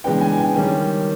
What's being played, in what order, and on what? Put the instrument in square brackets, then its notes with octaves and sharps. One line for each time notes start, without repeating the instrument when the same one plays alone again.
[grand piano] C#3 E3 G#3 B3 D4 G5
G#5
G5
D#3 G3 A#3 C#4